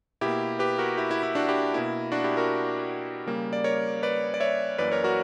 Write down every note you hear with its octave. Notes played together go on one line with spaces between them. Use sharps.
B2 A#3 E4 G4
G4 B4
F#4 A#4
E4 G4
E4
E4
D4 F#4
E4 G4
B2 A#3 E4
D4 F#4
E4 G4
F#4 A#4
C#3 G3 A#3
D5
A#4 C#5
B4 D5
D5
C#5 E5
F#2 E3 A#3 B4 D5
A#4 C#5
F#4 A#4